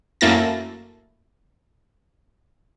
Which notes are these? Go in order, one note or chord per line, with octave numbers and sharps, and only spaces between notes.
F#2 A3 A#3 E4 A6 A#6